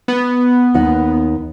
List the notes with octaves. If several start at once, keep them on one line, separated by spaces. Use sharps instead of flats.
B3
D#2 D#4 F#5